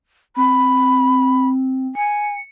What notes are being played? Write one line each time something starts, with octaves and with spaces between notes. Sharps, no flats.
C4 B5
G#5 C#7